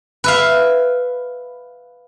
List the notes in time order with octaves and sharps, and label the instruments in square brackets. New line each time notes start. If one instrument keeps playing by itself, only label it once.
[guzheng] B4 E5 F5